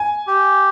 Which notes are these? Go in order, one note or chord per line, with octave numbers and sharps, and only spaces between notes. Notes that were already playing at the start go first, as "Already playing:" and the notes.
Already playing: G#5
G4